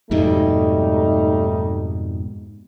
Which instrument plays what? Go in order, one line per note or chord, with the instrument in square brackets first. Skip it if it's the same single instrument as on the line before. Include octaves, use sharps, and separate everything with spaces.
[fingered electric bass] F2 G#2 B2 [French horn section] G3 A3 D#4